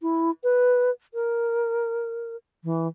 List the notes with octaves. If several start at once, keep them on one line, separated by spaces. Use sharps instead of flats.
E4
B4
A#4
E3